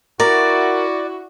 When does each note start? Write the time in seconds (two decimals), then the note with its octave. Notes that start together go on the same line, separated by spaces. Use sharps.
0.20 E4 F#4 A#4 D5